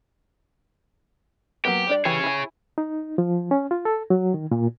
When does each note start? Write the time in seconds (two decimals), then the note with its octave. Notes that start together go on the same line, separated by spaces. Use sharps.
1.65 F#3 A#3 B3 G4
1.87 G3 D4 D5
2.05 E3 G4 G#4 C#5 G#5
2.24 E4 G#5
2.78 D#4
3.18 F3
3.51 C#4
3.71 F4
3.85 A4
4.10 F#3
4.34 D#3
4.51 A#2